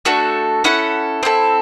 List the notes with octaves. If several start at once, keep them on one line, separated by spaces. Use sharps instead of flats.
A3 D4 F#4 A4
C#4 E4 A4 F#5
C4 E4 A4